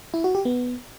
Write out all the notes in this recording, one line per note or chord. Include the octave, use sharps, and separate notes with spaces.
E4
F#4
G4
B3